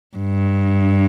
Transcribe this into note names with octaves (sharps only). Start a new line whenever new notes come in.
G2